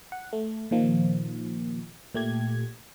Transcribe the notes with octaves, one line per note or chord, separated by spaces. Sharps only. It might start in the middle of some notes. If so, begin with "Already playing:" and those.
F#5
A3
A#2 D#3 F3 A#3
A#2 A3 G4 G#6